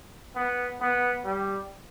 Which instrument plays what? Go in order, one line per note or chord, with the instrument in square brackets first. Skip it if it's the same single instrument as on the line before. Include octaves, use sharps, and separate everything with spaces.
[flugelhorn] B3
B3
G3